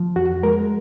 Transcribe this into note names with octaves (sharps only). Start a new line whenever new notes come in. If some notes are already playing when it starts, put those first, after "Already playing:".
Already playing: F3
F2 F#4
G#3 A#4